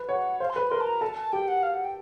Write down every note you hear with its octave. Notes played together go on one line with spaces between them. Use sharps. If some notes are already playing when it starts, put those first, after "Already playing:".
Already playing: B4
C#5 F#5
C5 F5
C6
B4 B5
A#4 C6
A5
A#5
A4 A5
A5
G4 G5
F#5
F5
F#5
G5